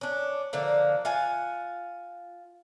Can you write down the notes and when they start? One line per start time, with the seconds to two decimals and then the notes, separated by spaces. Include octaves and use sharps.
0.01 C#4 D4
0.53 D3 F3 A#3
1.05 F4 F#5 G#5